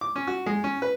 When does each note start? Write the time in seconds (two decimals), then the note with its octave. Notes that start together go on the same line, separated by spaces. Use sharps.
0.01 D6
0.16 C#4
0.27 F#4
0.46 G#3
0.64 C#4
0.82 B4